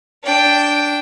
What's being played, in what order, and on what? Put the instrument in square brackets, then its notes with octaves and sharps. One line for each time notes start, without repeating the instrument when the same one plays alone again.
[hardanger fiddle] D4 G5